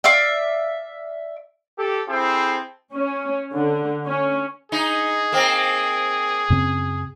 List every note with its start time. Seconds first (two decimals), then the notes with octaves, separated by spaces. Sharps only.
0.04 D5 E5 F5 D6
1.78 G4 A4
2.09 C4 E4 G#4 A4 C5 A5
2.95 C#4
3.53 D3
4.06 C#4
4.72 D#4 G#4
5.32 A#3 C4
6.50 F#2 C#3 C4